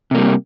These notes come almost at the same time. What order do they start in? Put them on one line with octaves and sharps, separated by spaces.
C3 A#3 G3